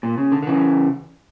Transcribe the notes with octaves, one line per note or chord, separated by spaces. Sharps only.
A#2
C#3
D3
D3
C#3 E3